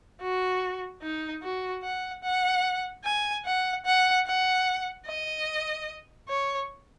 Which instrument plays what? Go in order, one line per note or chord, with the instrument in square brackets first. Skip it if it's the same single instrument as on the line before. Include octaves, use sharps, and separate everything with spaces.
[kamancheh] F#4
D#4
F#4
F#5
F#5
G#5
F#5
F#5
F#5
D#5
C#5